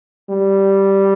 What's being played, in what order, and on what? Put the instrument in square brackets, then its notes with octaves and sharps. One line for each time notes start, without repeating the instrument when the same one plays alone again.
[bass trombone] G3